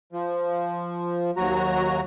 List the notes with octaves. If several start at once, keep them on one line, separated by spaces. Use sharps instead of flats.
F3
D#2 F#3 F#4 A#5